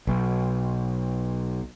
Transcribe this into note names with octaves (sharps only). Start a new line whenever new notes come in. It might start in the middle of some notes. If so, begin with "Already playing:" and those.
B1 B2